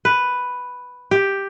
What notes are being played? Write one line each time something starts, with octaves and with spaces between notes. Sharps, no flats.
B4
G4